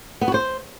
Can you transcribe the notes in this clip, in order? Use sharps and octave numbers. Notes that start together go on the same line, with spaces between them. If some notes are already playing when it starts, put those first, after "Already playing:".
B3
F#4
C5